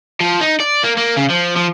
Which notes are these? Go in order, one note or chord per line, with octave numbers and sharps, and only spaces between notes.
F3
D#4
D5
A#3
A#3
C#3
F3
F3